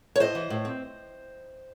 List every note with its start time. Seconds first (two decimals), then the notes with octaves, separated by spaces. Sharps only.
0.16 C#5
0.20 A2 C5 D#5
0.35 E3
0.50 A2
0.65 C4